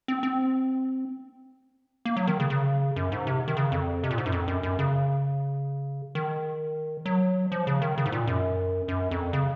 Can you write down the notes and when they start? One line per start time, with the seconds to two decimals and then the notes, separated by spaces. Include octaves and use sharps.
0.08 C4
0.23 C4
2.05 A#3
2.17 F#3
2.27 D#3
2.40 C#3
2.50 C#3
2.96 F#2
3.12 G#2
3.27 C3
3.48 D#3
3.57 C#3
3.72 F2
4.04 C3
4.11 A#2
4.18 G#2
4.26 F#2
4.32 F2
4.48 F#2
4.63 F#2
4.79 C#3
6.15 D#3
7.06 F#3
7.52 F3
7.67 C#3
7.82 D#3
7.98 C#3
8.06 G#2
8.12 A#2
8.27 F#2
8.88 F#2
9.11 F2
9.33 C#3